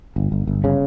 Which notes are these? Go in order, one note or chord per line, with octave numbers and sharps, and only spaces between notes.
G1
G1
G1
C#3